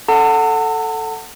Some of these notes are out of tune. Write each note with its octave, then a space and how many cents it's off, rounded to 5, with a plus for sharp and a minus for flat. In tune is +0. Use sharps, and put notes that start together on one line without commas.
A4 +0 F#5 +0 A5 +45